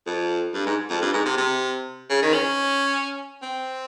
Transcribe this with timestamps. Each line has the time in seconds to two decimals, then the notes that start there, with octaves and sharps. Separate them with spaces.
0.06 F2
0.54 G2
0.66 G#2
0.90 F2
1.02 G2
1.13 G#2
1.26 C3
1.38 C3
2.10 C#3
2.22 D#3
2.34 C#4
3.42 C4